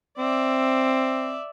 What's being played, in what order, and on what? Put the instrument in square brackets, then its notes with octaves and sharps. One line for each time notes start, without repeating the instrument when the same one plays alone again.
[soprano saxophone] C4 [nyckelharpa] D5 E5